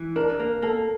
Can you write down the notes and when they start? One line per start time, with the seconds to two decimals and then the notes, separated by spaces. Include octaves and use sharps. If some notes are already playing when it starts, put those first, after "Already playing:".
Already playing: E3
0.16 D4 A#4
0.39 A#3 A#4
0.62 A#3 A4